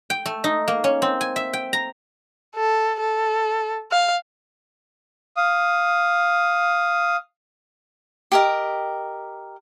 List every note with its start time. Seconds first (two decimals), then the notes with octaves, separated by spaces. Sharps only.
0.10 G5
0.26 A3
0.44 D#4
0.68 A#3
0.84 C#4
1.02 C4
1.21 G#5
1.36 E5
1.53 G5
1.73 A#5
2.55 A4
3.00 A4
3.91 F5
5.36 F5 D#6
8.32 G4 A#4 D#5